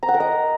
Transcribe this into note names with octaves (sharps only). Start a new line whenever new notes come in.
A#5
F#5
A#4
D#5